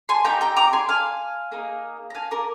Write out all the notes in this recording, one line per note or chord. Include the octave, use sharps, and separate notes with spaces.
G#5 C6
C4 D#4 G4 G5 A#5
G5 A#5
A#5 D6
G#5 C6
F5 G#5
A#3 D#4 G#4
A#5
F5 G#5
A#4 D5